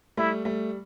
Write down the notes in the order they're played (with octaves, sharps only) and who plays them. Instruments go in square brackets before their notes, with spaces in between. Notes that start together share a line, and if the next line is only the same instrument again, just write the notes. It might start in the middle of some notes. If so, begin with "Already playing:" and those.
[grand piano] G3 A3 [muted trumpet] E4
[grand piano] G3 A3